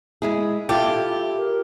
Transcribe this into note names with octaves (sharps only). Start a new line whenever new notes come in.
G#3 E4 G#4
E4 F4 G4 A4
A#4